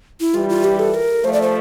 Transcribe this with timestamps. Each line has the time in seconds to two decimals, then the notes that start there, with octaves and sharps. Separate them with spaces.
0.20 E4
0.34 E3 G3 F4
0.49 F4
0.64 G4
0.79 A4
0.94 A#4
1.24 F3 A3 C5
1.33 D5
1.42 C5